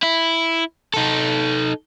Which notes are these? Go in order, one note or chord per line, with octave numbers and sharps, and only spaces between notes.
E4
D#4 A4